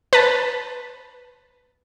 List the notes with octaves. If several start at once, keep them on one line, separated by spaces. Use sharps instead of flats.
B4 A5